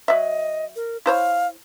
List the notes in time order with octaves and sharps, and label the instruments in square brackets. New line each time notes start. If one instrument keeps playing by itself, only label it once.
[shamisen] F#3 E5 [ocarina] D#5
[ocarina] A#4
[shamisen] E4 C5 C#5 [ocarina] F5